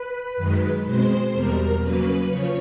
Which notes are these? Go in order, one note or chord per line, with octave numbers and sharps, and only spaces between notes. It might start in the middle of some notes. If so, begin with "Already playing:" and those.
Already playing: B4
F#2 D#3 G#3
B2 G#3 C4 C5
E2 B2 G3 A#4
C#3 F#3 A#3 B4
C#3 F3 C#5